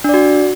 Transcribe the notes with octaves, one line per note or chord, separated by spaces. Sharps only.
D4 F#4 D5